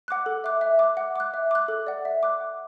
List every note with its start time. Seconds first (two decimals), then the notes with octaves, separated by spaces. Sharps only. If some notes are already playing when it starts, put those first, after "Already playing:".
0.08 F#5 D6 F#6
0.26 A4
0.44 E5 D6 F#6
0.61 E5
0.79 D6 F#6
0.97 F#5
1.16 D6 F#6
1.34 E5
1.51 D6 F#6
1.68 A4
1.87 D5 F#5
2.05 E5
2.23 D6 F#6
2.40 F#5